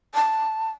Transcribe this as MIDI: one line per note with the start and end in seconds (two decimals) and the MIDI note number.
0.15 0.70 81